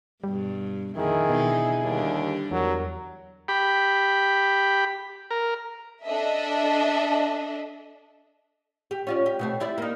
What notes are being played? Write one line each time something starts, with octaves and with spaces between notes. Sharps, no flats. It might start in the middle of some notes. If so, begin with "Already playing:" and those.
G2 B2 G3
F2 A#2 D3 D#3 E4 G#4
B2 D3 E3 D#4
D#2 D3 G3 D4
E2 F#3 A#4
G4 B5
A#4
D4 A4 D#5 E5
G4
C#4 F4 D5
G4
B2 A3 C4
G3 E4 D5
A#3 D#4